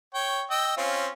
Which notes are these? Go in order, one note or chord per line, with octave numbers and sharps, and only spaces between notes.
C#5 G5
D#5 G5 E6
C4 C#4 F4